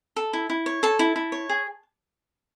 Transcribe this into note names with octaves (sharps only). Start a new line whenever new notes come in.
A4
E4
E4
C#5
A4 A5
E4
E4
C#5
G#4